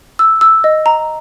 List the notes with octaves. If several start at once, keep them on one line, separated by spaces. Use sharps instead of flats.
E6
E6
D#5
A#5